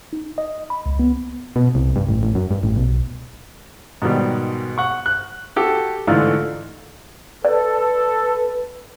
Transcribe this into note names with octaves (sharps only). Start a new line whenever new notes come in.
D#4
D#5
B5
C#2
B3
B2
C2
G2
A1
A1
F#2
G2
A1
B1
G#2 B2 D#3 G3
F#5 C#6
F#6
F#4 G4 A4
G#2 D3 E3 A3 F4
A4 B4 D5